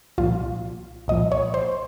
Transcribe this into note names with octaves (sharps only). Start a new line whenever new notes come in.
C2 A#2 F3 F4
C2 A#2 F3 D#5
C#5
C5